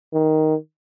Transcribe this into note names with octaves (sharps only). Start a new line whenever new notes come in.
D#3